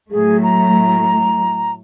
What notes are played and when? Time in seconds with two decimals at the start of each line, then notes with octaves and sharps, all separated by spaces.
0.11 A2 F#3 A3 G#4
0.43 A#5